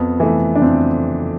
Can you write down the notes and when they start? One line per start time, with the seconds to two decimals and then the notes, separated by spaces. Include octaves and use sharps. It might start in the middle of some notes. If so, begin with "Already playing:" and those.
Already playing: F2 B3
0.20 E3 A3
0.55 D4
0.62 F2 C4